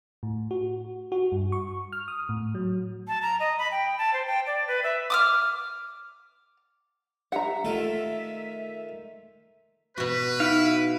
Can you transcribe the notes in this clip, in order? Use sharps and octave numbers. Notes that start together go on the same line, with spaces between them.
A2
F#4
F#4
G2
C#6
F6
D#6
A2
F#3
A5
A#5
D#5
B5
G5
A5
C5
G5
D5
B4
E5
D6 D#6 F6
G4 E5 F#5 A#5 C#7
D#3 A3 F4 A4
B2 F#4 B4
D#4 E4 F5